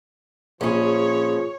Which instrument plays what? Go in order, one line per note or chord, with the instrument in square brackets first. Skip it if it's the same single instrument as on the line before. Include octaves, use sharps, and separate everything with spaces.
[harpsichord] A#1 [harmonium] F3 [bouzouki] C#4 G#4 [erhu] C#5